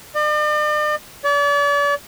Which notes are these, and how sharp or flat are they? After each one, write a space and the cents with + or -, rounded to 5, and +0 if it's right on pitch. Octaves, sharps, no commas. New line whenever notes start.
D5 +45
D5 -40